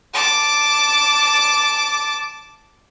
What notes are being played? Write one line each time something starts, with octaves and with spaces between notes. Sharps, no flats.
A5 D6